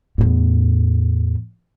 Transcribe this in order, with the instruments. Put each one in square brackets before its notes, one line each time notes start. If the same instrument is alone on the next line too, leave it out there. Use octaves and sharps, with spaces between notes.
[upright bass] E2 A2